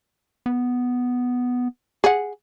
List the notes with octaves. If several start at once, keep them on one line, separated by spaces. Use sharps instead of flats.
B3
G#4 F#5